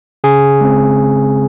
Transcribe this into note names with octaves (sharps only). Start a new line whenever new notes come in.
C#3 G#4
G#3 C4